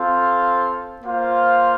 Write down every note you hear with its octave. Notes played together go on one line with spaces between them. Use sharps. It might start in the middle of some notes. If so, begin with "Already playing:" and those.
Already playing: C4 F4 A4 C5 F5
A#3 F4 C5 F5